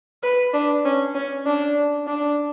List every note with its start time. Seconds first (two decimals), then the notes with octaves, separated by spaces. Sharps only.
0.23 B4
0.54 D4
0.85 C#4
1.15 C#4
1.46 D4
2.07 D4